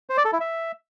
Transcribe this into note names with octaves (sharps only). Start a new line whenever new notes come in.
C5
D5
A4
E4
E5